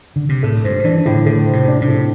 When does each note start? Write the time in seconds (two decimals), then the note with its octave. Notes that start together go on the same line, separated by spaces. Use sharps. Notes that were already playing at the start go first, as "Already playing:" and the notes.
0.16 D3
0.29 C3
0.43 A2 A3
0.64 G2 C5
0.84 E3 D4
1.06 A2 D3
1.26 D3 A3
1.47 C5
1.53 C3
1.68 D4
1.81 C3
1.88 A2